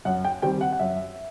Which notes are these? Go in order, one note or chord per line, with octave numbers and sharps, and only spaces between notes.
F#2 F#5
G5
D#3 G3 C4 G5
F#5
F#5
F#2 E5